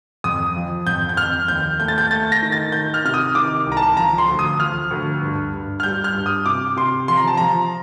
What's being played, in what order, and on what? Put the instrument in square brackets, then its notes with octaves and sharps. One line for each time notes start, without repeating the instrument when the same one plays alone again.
[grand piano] F2 D#6
F3
F2 G6
G6
F2 F6
D#2 G6
A3 G6
A6
G6
A3 A6
A#6
D#3
A6
D#3 G6
F6
C3 F6
D#6
D#3 D6
C2
A#5
A5
F3 A#5
C6
D2
D#6
F3 F6
D2
G2
G2
F6
G3 G6
F6
G2
D#6
C3 D6
C3 C6
F3 C6
A#5
A5
F3 A#5